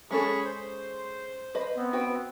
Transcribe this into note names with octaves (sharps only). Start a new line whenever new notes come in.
G#3 C#4 G#4 A4 B5 C#6
C5
B4 D#5
B3 C4
F#4 B4 G5